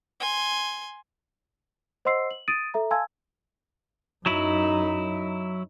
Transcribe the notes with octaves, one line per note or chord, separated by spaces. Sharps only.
G#5 C6
C5 D#5 F#5 C6 E6 C7
F#7
D#6 A6 D7 D#7
A4 E5 A#5
F5 G#5 A5 C6 E6 G#6
F#2 F#3 D#4 E4